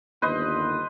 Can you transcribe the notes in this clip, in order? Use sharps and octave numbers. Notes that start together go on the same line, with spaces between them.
G1 D#2 B4 C5 D#5